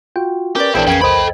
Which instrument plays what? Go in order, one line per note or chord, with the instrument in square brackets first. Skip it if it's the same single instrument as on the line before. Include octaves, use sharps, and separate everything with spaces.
[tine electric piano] F4 F#4 [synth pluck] G5
[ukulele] C#4 D5 [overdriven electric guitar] G4 [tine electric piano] A#4 B4
[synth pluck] A#1 E3 [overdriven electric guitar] D4 E4 [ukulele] G#4 C5 G5
[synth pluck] F2 G#6 [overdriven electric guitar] C#3 [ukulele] G5 G#5
[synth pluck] C2 C5 D#5 [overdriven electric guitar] A4 B5 [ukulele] G5